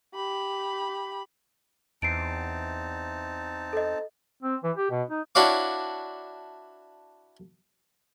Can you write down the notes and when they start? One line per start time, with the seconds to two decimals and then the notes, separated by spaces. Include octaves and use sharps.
0.15 G4 B5
2.02 E2 C4 D#4 A5 C7 D7
3.73 A4 D#5
4.43 C4
4.63 E3
4.76 G4
4.91 B2
5.10 D#4
5.35 D4 E4 F#4 C#5 F5 D6